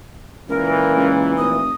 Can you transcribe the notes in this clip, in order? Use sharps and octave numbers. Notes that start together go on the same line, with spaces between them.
C#2 A#2 E3 A#4
C#2
F1 D#6